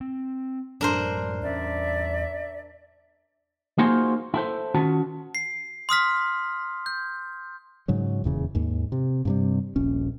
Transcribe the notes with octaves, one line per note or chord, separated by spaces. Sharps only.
C4
F#2 A2 F#3 D4 A#4 C5
E2 C#4 D5 E5
A#3 D#4 F4 F#4 G#4 C5
E4 A4 C5
D#3 C#4 F4 F#4 A5
C7
C6 D#6 F6 B6
G6
G#2 C#3 F#3
D#1 E2 C#3
D#2 G#2
C3
G2 C3 G3
D#1 A#1 C#4